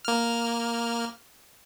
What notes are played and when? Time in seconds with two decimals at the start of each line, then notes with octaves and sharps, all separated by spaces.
0.05 A#3 F6